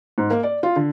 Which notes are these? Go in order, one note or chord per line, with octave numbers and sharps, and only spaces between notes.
G#2
A#3
D5
F4
D3